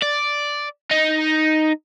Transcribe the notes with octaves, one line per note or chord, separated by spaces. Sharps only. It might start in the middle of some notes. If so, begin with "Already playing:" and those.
D5
D#4